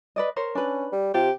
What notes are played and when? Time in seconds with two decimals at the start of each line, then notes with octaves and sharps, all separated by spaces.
0.16 B4 D5 D#5
0.36 A#4 C5 C#5
0.55 C#4 D4 B4
0.92 G3
1.14 C3 F4 G4